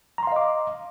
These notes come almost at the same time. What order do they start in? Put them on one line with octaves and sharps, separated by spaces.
A#5 C6 F5 D#5 D6